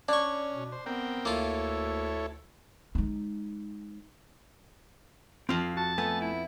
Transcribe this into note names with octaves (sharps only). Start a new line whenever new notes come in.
C#4 D4 D5 C#6
B2
C5
B3 C4 A#4 G5
D2 A#3 E4 F4 A4 C#5
G#3 D#4
F2 C4 F4 F5
F#4 A5
A3 B3 A4 G#5
E4